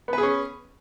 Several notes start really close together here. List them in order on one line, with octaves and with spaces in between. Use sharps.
B3 B4 G#4 C#4